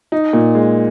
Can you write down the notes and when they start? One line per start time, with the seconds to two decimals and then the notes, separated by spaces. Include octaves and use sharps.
0.12 D#4
0.33 A#2
0.55 G#3